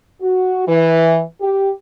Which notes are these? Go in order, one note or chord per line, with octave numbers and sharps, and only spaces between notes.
F#4
E3
G4